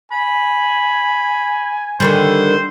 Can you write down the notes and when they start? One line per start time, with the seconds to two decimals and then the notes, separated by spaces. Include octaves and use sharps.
0.12 G#5 B5
2.00 D3 D#3 G3 C5